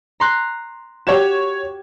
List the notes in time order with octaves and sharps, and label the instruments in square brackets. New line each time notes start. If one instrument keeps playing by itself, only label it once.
[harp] A#5 C6 F#6
[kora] F#4 G4 [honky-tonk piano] C#5 G#6 E7